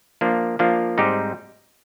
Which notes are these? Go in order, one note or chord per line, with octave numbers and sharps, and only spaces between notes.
F3 A#3 D4 F4
F3 A#3 D4 F4
G#2 G3 C4 D#4 G4